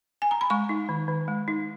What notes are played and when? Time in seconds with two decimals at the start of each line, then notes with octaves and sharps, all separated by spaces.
0.22 G#5
0.31 A#5
0.41 B5
0.50 G#3 C#6
0.69 D#4
0.89 D#3
1.08 D#3
1.28 G#3
1.48 D#4